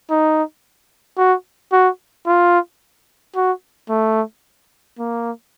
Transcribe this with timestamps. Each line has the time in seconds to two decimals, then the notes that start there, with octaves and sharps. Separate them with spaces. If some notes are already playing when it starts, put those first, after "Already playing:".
0.10 D#4
1.18 F#4
1.72 F#4
2.26 F4
3.36 F#4
3.89 A3
4.99 A#3